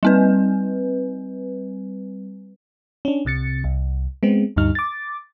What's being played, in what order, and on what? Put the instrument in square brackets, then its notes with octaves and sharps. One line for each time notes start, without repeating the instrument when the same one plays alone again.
[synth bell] G3 C4 B4
[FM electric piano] C#4 D4
C2 C3 A6 C#7
C2
G#3 B3 C4
D2 G2 G3 D#4 F6
D6 A6